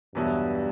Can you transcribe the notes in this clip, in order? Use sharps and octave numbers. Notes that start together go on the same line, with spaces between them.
E2 G2 B2 F#3 B3 E4